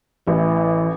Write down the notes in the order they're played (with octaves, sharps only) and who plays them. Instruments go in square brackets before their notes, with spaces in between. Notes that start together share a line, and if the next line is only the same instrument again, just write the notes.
[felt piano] A1 [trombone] E3